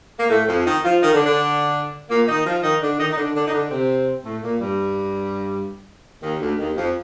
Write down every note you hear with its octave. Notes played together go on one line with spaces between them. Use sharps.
A#3
A2 A3
F2 F3
D#3 D#4
F3 F4
D#3 D#4
D3 D4
D3 D4
A#2 A#3
D#3 D#4
F3 F4
D#3 D#4
D3 D4
D#3 D#4
D#4
D3 D4
D3 D4
D#4
D3 D4
C3 C4
A2 A3
A#2 A#3
G2 G3
D#2 D#3
D2 D3
D#2 D#3
F2 F3